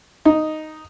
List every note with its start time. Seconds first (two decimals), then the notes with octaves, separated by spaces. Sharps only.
0.25 D#4